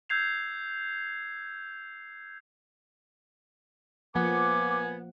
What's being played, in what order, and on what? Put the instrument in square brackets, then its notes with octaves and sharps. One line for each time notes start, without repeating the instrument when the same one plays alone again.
[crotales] E6 G6 G#6 C7 F7
[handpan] F3 A#3 F#5 [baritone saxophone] B3 [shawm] G#5 [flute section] D6